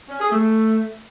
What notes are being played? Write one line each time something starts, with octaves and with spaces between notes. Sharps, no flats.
C#4
G#4
A3